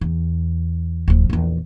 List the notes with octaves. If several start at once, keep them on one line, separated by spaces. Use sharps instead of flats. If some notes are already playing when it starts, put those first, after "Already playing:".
E2
D1 F3
A#1 E2